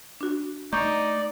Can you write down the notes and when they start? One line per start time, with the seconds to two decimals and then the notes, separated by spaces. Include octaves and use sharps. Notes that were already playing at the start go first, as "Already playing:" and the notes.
0.21 D4 F#4
0.73 A3 D#4 D5 A#5 C#6 G6